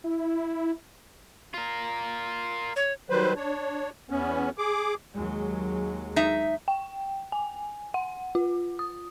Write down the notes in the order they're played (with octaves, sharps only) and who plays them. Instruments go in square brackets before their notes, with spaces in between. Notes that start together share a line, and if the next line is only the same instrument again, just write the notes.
[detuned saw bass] E4
[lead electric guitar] F4 A#4
[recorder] C#5
[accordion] D#3 F#3 G3 B4 C5
D4 C#5
E2 B3 C#4
G#4 D6
[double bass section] D#2 F#3 G#3
[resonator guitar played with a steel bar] D#4 E5
[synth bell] G5
G#5
F#5
F4
D#6